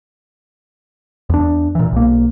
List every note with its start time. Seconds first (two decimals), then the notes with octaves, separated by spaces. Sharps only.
1.30 E2 D4
1.75 A#2 E3
1.92 B1 A#3